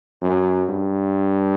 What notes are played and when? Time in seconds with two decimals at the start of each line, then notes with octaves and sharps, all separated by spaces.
0.22 F#2
0.69 G2